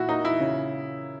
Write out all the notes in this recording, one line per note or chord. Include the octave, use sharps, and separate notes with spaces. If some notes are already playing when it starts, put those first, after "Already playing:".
Already playing: A#2 E4 F#4
A#3 D#4
E4
C#3